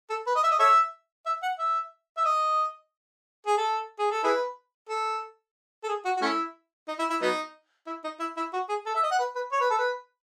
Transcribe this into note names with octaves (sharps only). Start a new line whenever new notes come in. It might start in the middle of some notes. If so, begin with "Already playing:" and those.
A4
B4
D#5
E5
D#5
A4 C#5 E5
E5
F#5
E5
E5
D#5
G#4
A4
G#4
A4
E4 G#4 B4
A4
A4
G#4
F#4
F#4
A3 C#4 E4
D#4
E4
E4
F#3 B3 D#4
E4
D#4
E4
E4
F#4
G#4
A4
E5
D#5
F#5
B4
B4
C#5
B4
A4
B4